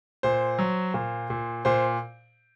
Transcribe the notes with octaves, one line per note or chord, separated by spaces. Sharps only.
A#2 C5
F#3
A#2
A#2
A#2 C5